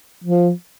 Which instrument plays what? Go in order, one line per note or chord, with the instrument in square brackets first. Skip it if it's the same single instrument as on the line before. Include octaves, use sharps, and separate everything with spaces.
[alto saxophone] F3